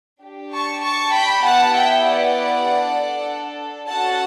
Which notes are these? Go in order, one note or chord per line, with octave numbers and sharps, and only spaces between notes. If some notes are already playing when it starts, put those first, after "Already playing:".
D4 G4
A5 C#6
A5 C#6
G5 B5
B3 E4 G4 F#5 A5
E5 G5
D5 F#5
D4 A4
C#4 F#4 A4 F#5 A5